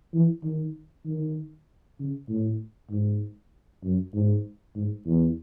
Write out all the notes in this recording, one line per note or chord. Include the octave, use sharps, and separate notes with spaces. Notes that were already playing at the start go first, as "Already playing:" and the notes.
E3
D#3
D#3
C#3
A2
G#2
F#2
G#2
G#2
E2